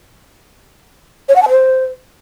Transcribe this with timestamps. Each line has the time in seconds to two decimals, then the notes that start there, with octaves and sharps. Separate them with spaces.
1.29 C#5
1.36 F#5
1.43 A5
1.50 C5